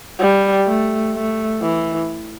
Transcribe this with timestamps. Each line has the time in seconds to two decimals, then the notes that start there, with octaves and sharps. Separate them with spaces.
0.19 G3
0.67 A3
1.15 A3
1.62 E3